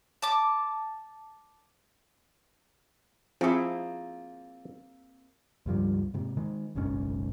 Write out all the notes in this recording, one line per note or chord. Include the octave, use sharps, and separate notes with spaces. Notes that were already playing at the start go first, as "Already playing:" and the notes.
A5 D6
F3 A#3 C4 E4 F4 G#4
C#2 G2 F3 G3
G#2 C3
D#3 G#3
F#1 B1 G#2 C#4